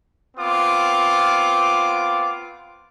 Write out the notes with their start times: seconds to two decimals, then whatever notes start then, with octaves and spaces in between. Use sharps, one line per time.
0.37 B3 C4 F4 D6